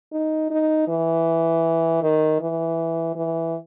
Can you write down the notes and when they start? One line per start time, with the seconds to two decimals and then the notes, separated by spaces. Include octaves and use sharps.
0.12 D#4
0.50 D#4
0.88 E3
2.03 D#3
2.40 E3
3.16 E3